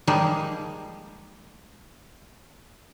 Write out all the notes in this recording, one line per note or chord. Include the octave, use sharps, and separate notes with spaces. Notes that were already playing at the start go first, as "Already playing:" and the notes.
D#3 F3 G3 G#3 A#3